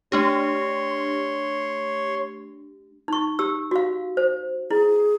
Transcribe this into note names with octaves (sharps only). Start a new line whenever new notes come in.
A3 D4 G4 C#5 C6
D#4 C#6
G4 E6
F#4 F5
C5
E4 G#4